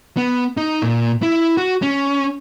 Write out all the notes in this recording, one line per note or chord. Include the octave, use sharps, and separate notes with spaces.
B3
D#4
A#2
E4
F#4
C#4